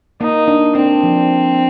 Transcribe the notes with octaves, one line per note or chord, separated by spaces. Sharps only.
A#3 D#4
D4
C4 D4
F3